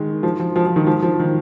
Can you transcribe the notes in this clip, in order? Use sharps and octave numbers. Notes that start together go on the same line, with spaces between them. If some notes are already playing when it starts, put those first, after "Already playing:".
Already playing: D#3 G#3
F3
F3
F3
F3
D#3
F3
F3
D#3